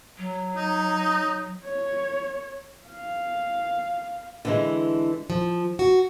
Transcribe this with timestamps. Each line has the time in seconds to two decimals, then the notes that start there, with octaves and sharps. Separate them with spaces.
0.18 F#3
0.56 D#4
1.65 C#5
2.87 F5
4.45 D3 E3 G#3
5.30 F3
5.79 F#4